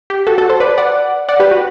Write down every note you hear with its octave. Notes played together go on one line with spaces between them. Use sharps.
G4
F#4 A4
F#4 A4
A4 C5
B4 D5
D5 F#5
D5 F#5
G4 B4
F#4